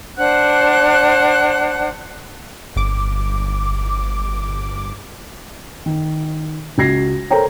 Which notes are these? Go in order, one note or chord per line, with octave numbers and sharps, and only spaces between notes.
D4 C5 F#5 F#6
G1 D6
D#3
C#2 F#4 G#6 A#6 C7
A4 A#4 C5 C#5 G5 A#5